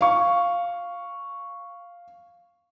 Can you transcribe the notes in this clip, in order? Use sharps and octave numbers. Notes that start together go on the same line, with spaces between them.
F5 C#6